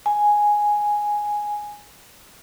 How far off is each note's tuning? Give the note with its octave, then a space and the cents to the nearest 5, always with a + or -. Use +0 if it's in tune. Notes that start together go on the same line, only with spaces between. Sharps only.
G#5 +0